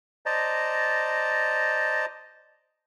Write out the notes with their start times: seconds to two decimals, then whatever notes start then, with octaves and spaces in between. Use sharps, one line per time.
0.26 C5 D5 D#5 A5 A#5